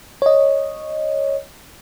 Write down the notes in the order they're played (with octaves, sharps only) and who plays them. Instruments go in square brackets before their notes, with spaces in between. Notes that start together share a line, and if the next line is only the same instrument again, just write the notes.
[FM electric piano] C#5 D#5